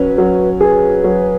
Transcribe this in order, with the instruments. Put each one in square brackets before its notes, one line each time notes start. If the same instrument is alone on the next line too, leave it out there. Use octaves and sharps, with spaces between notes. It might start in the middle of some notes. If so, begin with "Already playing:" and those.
Already playing: [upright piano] F#3 C#4 [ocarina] B4
[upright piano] F#3
[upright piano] G#4 [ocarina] B4
[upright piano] F#3